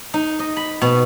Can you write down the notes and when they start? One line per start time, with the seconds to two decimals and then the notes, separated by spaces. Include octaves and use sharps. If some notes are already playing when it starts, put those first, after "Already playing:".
0.14 D#4
0.39 D#5
0.57 B5
0.82 B2